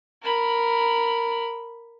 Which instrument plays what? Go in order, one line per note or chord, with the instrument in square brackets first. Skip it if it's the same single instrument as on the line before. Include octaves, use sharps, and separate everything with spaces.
[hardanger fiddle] A#4 B5